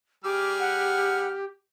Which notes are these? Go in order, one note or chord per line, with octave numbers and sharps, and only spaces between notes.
G3 G4 G#4 D6 F6
F#5